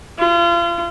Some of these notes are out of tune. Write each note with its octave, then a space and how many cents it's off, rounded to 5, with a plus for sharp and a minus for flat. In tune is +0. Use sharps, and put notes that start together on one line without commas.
F4 -35